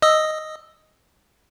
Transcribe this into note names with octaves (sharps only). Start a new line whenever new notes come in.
D#5 D#6 E6